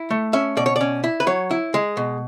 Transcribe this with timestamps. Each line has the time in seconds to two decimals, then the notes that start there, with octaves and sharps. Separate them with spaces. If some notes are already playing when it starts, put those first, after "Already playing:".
Already playing: E4
0.11 A3
0.33 C#4 E5
0.57 B2 D5
0.66 C#5
0.76 C#4 D5
1.04 E4
1.20 B4
1.27 F#3 C#5
1.51 E4
1.74 G#3
1.97 B2